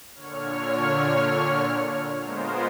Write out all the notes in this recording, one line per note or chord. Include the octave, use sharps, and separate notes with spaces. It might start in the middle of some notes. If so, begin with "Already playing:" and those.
A#2 D3 C#5 F6
G#3 B3 F4 A#4 C5